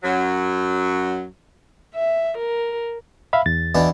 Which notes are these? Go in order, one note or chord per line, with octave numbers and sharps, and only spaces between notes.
F#2 F#3
E5
A#4
E5 F5 B5
E2 A6
B2 E3 D4